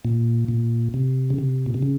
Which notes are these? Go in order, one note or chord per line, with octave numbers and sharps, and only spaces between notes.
A#2
A#2
C3
C#3
C3
A#2
C3
C#3